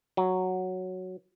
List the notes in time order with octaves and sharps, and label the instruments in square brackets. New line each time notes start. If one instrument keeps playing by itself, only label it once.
[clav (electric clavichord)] F#3